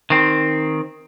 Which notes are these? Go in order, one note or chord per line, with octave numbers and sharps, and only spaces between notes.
D#3 C4